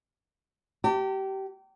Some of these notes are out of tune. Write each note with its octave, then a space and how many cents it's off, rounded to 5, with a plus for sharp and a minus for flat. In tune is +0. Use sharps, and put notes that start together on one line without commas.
G4 -25 A5 +45